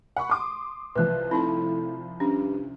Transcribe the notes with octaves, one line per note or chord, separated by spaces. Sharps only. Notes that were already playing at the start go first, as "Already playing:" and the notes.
F#5 B5 C#6
C6 D6 D#6
C2 F3 B4 F#6
A2 C4 D#4 A5 B5
G2 C#4 D4